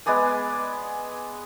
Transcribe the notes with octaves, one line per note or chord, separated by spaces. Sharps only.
G#3 B3 D5 G#5